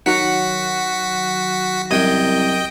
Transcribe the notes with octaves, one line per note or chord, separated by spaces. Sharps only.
D#3 F#3 F#4 F#5 B6
C2 F#2 D#5 G5 G#5